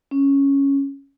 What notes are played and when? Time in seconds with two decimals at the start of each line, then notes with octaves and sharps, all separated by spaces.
0.11 C#4